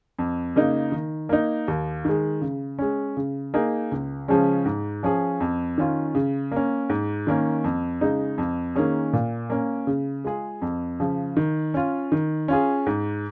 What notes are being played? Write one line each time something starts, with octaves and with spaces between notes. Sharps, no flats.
F2
C#3 A#3 D#4
D#3
A#3 D#4
D#2
D#3 G#3
C#3
G#3 C#4
C#3
A#3 D#4 G#4
C#2
C#3 F3 G#3 C#4
G#2
F3 C#4 G#4
F2
D#3 C#4 F4
C#3
A#3 C#4
G#2
D#3 A#3 C#4
F2
C#3 G#3 D#4
F2
D#3 A#3 C#4 G#4
A#2
A#3 C#4
C#3
G#3 F4 G#4
F2
C#3 F3
D#3
C#4 F4
D#3
C#4 F4 G#4
G#2